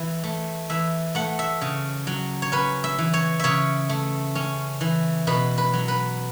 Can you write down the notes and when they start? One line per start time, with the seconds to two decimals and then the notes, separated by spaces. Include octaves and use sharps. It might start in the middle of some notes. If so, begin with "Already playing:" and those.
Already playing: E3
0.24 A3
0.70 E3 E5
1.15 A3 F#5
1.39 E5
1.61 C#3
2.07 F#3
2.42 C#5
2.52 C#4 B4
2.84 E5
2.98 E3
3.13 C#5
3.40 C#3 C#5 E5
3.89 A3
4.35 C#4
4.81 E3
5.27 B2 B4
5.58 B4
5.73 F#3
5.88 B4